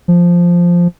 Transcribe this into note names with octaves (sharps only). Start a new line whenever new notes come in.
F3